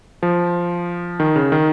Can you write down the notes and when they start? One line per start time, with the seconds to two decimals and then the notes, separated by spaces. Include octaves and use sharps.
0.23 F3
1.20 D#3
1.36 C#3
1.52 D#3